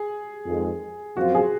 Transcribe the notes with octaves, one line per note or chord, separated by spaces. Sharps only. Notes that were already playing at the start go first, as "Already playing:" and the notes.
Already playing: G#4
F2 D#3 G#3
F#2 F3 C4 F4 F#4
G#4